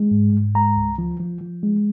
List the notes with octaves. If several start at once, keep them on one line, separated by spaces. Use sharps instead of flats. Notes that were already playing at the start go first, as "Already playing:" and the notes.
Already playing: G#3
G#2
G#2
G#3 A#5
C#2
F3
F3
F3
G#3